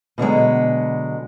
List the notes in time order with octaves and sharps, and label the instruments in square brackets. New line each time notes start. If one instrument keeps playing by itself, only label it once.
[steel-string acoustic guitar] B2 D3 F#3 G#3